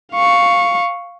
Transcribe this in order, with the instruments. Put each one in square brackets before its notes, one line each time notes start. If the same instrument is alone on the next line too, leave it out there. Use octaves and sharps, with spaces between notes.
[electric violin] F5 C#6